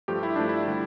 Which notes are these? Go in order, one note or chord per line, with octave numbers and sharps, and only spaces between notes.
G2 F3 A3 G4
E4
G2 F3 A3 D4
E4
D3 G3